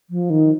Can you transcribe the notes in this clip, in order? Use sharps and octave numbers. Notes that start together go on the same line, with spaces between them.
F3
D#3